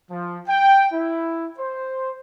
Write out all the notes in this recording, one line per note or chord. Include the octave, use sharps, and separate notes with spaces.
F3
G5
E4
C5